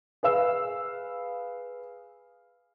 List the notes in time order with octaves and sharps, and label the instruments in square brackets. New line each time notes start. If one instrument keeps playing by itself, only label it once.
[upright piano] G#4 B4 F5 E6